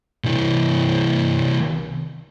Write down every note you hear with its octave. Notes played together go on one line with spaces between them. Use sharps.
C2 E3